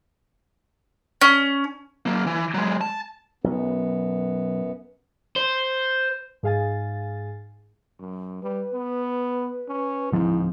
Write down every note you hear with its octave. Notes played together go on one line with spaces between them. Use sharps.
C#4
F#3 A#3
E3
F#3 G#3
A5
B1 F#2 B3
C5
G#2 G#4 F5 G#5 A6
F#2
G3 B4
B3
C#4
D1 G#2 F3 C4 E4